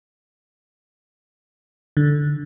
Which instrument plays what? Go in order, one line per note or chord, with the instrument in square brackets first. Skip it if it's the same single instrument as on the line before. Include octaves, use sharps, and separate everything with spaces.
[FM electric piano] D3